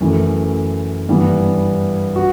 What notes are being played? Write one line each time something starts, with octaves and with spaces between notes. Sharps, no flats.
F#2 E3 A3
G2 E3 B3
F#4